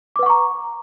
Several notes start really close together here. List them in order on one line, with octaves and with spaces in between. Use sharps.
D6 B4 F#5 C#6 A#5